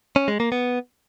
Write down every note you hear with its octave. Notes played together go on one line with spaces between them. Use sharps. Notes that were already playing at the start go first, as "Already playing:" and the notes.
C#4
G#3
A#3
B3